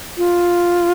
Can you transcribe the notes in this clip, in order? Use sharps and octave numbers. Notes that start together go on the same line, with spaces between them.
F4